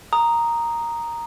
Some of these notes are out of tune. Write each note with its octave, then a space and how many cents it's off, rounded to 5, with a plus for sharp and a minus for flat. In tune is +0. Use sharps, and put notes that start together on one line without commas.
A#5 +0 D#6 -5